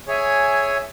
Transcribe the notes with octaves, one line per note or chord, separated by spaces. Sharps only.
G#4 C#5 E5 G#5